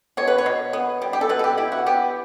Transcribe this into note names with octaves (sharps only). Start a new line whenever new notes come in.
B2 C#5
B4
C#5
B2
B3
G3
G4
A4
B2 B4
A4
G4
E4 G4
F#4
B3 G4